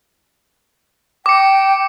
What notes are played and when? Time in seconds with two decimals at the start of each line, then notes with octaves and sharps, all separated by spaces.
1.26 G5 D6 C#7